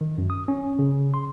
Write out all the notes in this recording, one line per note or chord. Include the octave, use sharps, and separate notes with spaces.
D#3
F#2
D#6
C#4
C#3
C6